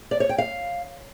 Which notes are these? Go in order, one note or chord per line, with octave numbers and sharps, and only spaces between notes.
D5
C#5
G5
F5